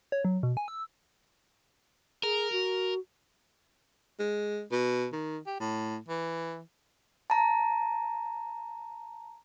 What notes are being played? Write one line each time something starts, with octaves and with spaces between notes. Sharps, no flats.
C#5
F#3
B2
G#5
E6
G#4 A#4
F#4
G#3
B2
D#3
G4
A2
E3
A5 A#5